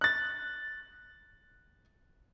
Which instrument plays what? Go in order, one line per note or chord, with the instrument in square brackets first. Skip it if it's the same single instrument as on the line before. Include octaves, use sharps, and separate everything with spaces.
[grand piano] F#6 A6